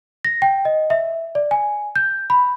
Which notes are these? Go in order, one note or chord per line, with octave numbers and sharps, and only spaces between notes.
A#6
G5
D#5
E5
D5
G#5
G6
B5